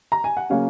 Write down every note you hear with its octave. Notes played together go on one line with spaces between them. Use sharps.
A#5
G#5
F#5
C#3 F#3 A#3 C#4 C#5 F5